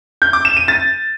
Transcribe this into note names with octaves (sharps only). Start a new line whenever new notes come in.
G6
D6
E7
D#7
A6